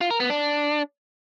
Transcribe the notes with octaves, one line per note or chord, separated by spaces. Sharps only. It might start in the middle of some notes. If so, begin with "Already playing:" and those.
F4
A#4
B3
D4